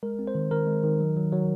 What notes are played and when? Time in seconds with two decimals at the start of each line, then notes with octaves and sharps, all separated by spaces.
0.03 G#3 A#4
0.19 C4
0.27 C5
0.35 D#3
0.51 D#3 A#4
0.67 G#3
0.83 D#3
1.00 F#3
1.16 F#3
1.32 F#3